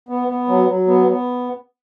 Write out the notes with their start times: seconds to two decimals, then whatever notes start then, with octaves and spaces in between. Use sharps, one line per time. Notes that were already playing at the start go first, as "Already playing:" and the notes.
0.09 B3
0.28 B3
0.48 F#3
0.68 F#3
0.87 B3
1.08 B3